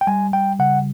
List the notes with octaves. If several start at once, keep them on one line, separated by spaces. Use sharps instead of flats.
G5
G3 G#5
G3 G5
C#3 F#5